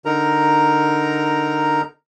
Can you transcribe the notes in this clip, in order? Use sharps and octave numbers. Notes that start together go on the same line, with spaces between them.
D3 D#4 A#4 A#5